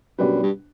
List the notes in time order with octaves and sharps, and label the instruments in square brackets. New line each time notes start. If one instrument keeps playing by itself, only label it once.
[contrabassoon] F#2 [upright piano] B2 G3 D4 G4 B4
[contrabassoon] G2